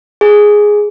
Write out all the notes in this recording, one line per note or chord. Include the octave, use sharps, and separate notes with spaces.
G#4